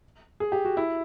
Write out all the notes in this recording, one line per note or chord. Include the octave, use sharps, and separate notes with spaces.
G#4
G4
F#4
E4